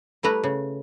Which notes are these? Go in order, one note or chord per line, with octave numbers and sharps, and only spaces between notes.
G3 A3 E4 B4 A#5
C#3